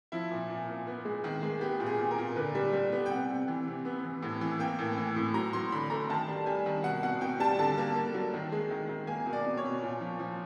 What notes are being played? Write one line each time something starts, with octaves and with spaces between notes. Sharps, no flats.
F3 E4
A#2
A#2
A#2
B3
G#3
D#3
G#3
B3 G4
A#2
G#4
A#2
A#4
A#2
D3 B4
G3
G3
B3
G5
C3 F#5
C3
E3
C3
B3
E3
A2
E3
A#3 G5
A2
E3
A2
F#3 A#5
F#3 C6
D3 B5
A3 A#5
D#3 A5
G3
G3 G#5
D#3
B2 F#5
B2 F#5
B2 G5
G3 A5
D3 A5
A#3
A#3
F#3
D#3
G#3
D#3
D#3
A#3 G#5
B2
D5
B2
C#5
B2
A#2
F3
F3